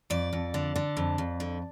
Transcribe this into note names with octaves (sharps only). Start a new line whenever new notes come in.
F2 D5
F2
D3
D3
F2
F2
D3